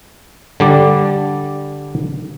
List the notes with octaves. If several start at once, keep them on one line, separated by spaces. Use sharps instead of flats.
D3 G3 D5